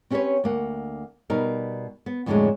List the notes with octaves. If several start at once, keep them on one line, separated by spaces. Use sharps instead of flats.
C4 C#4 G4 A#4 B4 C#5
D2 A#3 F#5
B2 G3 D#4 A#4
B3
F2 A2 D3 D#3 F#3 G#3